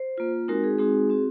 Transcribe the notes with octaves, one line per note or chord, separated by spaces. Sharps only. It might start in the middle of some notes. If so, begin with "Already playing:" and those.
Already playing: C5
A#3 F4
G#3 C4 D#4 F#4 A#4
G#4
G#3 C4 D#4 F#4 G#4
C4 F#4